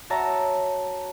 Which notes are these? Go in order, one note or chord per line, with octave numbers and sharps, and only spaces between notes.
F#4 C#5 E5 A5 A#5